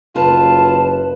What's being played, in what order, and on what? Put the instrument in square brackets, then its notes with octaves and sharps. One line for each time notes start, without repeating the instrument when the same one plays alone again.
[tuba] F#1 [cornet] F4 [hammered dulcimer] B4 [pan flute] A5